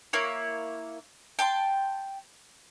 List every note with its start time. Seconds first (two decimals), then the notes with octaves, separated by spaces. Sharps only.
0.13 A#3 E4 C#5
1.39 G5 A5 C6